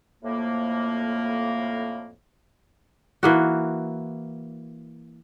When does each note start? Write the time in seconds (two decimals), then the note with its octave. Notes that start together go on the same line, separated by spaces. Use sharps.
0.24 F2 A2 A#3
3.23 E3 A#3 F#4